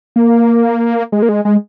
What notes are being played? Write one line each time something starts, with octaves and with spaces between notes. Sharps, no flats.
A#3
G#3
A#3
G#3
G#3